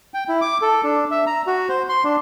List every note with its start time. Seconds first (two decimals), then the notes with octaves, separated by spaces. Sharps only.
0.14 G5
0.29 E4
0.41 D6
0.62 A4
0.84 D4
1.11 E5
1.27 A#5
1.47 F#4
1.69 C5
1.89 C6
2.04 D4